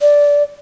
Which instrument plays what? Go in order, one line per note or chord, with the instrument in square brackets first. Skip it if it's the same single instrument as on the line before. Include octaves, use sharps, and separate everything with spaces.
[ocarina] D5